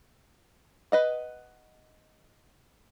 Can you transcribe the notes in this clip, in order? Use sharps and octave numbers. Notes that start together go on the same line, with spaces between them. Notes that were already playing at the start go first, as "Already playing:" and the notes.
B4 D#5 F#5